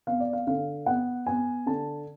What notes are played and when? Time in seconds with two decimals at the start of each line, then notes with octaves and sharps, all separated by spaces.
0.07 B3 F5
0.20 D5
0.33 F5
0.47 D3 F5
0.86 B3 F#5
1.27 B3 G#5
1.66 D3 A5